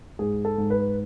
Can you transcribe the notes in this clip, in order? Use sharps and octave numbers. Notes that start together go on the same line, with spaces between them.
G#2 G#4
A4
G#2
B4